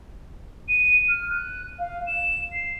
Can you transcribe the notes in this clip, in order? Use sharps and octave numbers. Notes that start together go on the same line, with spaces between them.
D#7
F6
F#6
F5
E7
C7